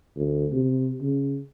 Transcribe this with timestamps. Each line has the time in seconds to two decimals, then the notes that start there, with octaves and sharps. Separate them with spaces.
0.16 D2
0.52 C3
1.01 C#3